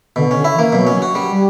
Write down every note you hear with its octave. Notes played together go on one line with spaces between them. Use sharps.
B2 D3
D3 C#4
E4
E3
A#3
B2 F#3
C#4
F#4
G3
G3